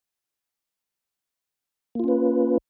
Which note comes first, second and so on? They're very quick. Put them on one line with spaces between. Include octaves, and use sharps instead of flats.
A#3 F4 C#4 B4